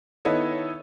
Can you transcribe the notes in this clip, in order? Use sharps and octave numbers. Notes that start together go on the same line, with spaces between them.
D#3 B3 E4 A4 C#5 D#5